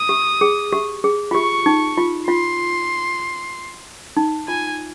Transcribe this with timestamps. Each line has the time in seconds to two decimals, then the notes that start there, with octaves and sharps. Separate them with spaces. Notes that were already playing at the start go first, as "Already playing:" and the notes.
Already playing: D#6
0.09 G4
0.41 G#4
0.73 G4
1.04 G#4
1.31 F4
1.34 G4 C#6
1.66 D#4
1.98 F4
2.28 F4 C6
4.17 D#4
4.48 F4 G#5